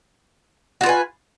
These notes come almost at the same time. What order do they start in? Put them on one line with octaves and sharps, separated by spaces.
F#4 F4 B4 G#5